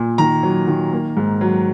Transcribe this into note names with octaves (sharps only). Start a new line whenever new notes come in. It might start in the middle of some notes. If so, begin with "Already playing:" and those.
Already playing: A#2
D#3 A#5
F#3
D#3
A#3
G#2
F#3